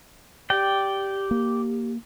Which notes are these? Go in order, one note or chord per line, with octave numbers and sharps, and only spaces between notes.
G4 D5 G5
A#3